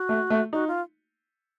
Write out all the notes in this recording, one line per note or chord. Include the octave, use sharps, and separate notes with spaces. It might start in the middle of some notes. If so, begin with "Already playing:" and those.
Already playing: F#4
A3
A3
D#4 F#4
F4